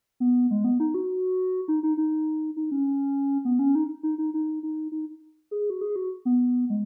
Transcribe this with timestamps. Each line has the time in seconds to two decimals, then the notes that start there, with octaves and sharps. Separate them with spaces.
0.20 B3
0.51 G#3
0.64 B3
0.80 D#4
0.94 F#4
1.68 D#4
1.83 D#4
1.97 D#4
2.57 D#4
2.72 C#4
3.45 B3
3.59 C#4
3.75 D#4
4.03 D#4
4.18 D#4
4.34 D#4
4.63 D#4
4.92 D#4
5.51 G#4
5.70 F#4
5.81 G#4
5.96 F#4
6.25 B3
6.70 G#3